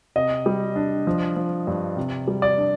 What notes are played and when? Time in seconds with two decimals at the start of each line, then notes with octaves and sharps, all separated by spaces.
0.16 C3 D#5
0.46 G3
0.76 D4
1.07 F3
1.36 F3
1.67 G2
1.96 C3
2.28 G3
2.42 D5
2.58 D4